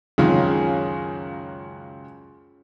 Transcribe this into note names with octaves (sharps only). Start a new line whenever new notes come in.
C#2 F#2 D#3 C#4 F4 G#4